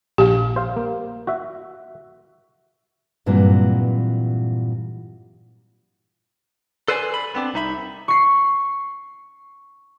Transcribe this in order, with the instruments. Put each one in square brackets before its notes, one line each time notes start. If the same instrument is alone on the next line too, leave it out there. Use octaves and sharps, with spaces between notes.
[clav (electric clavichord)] A#1 F5 [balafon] G4
[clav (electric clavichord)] C5 F5
A#3
F#4 E5
[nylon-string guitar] G2 A#2 E3 F#3 C4
[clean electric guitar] A4 B4 C5 D5 G5 G#5
B5
B3 C4 D4
C2 D#4 E5 B5
[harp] C#6 C7